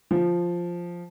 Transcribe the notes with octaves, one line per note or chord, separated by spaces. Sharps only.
F3